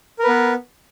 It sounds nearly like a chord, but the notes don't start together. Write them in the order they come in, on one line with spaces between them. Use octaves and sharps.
A#4 B4 B3